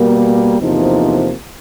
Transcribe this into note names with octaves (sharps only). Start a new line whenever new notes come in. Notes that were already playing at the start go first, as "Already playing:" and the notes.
Already playing: B2 G3 A#3
E2 C3 F3 A#3 D#4